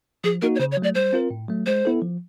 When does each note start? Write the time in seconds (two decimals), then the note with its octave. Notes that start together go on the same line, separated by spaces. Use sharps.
0.24 F3 G#4
0.42 A#3 D#4 F#4 A#4
0.55 C#5
0.60 C#3 C5
0.72 C#5
0.77 F#3
0.82 A3 D5
0.95 G3 C5
1.13 C4 F4 A#4
1.30 A2
1.48 F#3 A3
1.66 G#3 C5
1.85 B3 E4 A4
2.02 F3